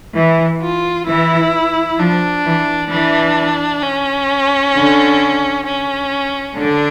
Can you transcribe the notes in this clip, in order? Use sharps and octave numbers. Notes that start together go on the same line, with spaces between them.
E3
F4
E3 E4
F3 D4
E3
E3 D4
C#4
D3
C#4
D3 D4